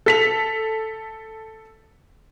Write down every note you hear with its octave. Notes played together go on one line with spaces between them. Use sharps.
A4 B6 F7